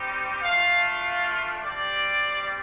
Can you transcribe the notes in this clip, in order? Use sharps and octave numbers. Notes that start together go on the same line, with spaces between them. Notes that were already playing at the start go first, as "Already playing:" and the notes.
Already playing: G3 C4 D#4 G4
A3 D4 F4 F5
F5
G3 C4 G4 D5